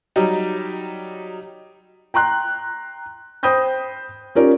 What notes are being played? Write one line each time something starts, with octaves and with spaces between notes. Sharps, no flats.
F#3 G3 D#4
G5 A#5 C6 F#6
C5 G5 B5 D#6 G6 A#6
C#4 D#4 F4 G4 A#4 D5